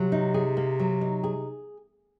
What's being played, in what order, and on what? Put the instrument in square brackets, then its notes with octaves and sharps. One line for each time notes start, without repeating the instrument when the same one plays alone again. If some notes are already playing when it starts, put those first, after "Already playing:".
Already playing: [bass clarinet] C3 [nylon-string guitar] F#3
[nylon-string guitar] D#4
G#4
A#3
F#3
D#4
G#4